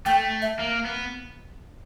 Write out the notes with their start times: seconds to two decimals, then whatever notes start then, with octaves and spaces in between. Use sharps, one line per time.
0.06 A3 G5
0.42 E5
0.59 A#3
0.85 B3